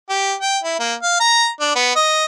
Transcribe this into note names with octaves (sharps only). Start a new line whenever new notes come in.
G4
G5
E4
A#3
F5
A#5
D4
B3
D#5